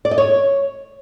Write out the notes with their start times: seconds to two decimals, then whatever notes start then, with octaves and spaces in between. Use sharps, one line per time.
0.05 D5
0.11 D#5
0.18 C#5